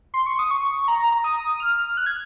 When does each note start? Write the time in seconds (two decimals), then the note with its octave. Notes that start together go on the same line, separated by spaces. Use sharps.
0.14 C6
0.26 C#6
0.39 D#6
0.51 C#6
0.88 A#5
1.00 A#5
1.12 A#5
1.24 D#6
1.55 D#6
1.60 F6
1.97 F#6
2.06 G#6